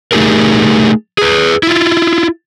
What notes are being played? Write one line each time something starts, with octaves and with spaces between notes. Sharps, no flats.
A3 D#4 G4 G#4 A#4
G#4 B4
E4 F4